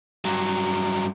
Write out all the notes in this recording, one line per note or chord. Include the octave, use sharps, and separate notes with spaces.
G2 F#3